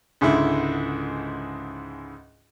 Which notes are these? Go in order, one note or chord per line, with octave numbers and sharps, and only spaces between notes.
C#2 G#2 D3 E4